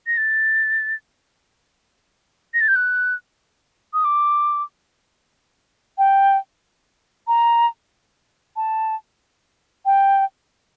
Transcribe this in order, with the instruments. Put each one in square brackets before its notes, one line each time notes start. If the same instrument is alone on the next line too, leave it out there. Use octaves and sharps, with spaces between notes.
[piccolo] A#6
A6
A#6
A6
G6
F#6
D#6
D6
G5
A#5
A5
G5